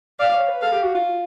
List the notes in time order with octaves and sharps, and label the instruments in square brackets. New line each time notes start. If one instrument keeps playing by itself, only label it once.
[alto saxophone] D5 [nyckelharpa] F5
[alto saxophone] C#5
B4
[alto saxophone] A4 [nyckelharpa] F5
[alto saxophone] G4
F#4
F4